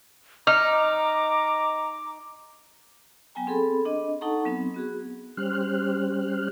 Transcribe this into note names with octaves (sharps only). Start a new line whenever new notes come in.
D#4 A#5 D6 F6
F#3 B3 G5 G#5 A#5
C4 G#4 A4 B5 C6
D4 D#5
D#4 A4 F#5 A5 A#5 C#6
F#3 B3 C4
B3 F#4 G#4
G3 C#4 G4 C5 F6 F#6